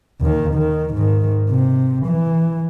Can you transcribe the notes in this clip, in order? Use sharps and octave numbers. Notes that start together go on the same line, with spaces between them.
D#2 D#3
D#3
G#2 D#3
C3
E3